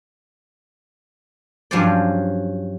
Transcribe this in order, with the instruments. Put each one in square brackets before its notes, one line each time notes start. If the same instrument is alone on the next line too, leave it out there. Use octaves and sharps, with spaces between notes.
[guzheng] G2 F3 F#3 C#4 C5 D5